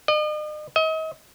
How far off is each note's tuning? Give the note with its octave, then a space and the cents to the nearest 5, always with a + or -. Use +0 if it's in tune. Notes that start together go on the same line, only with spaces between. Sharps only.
D#5 -40
D#5 +40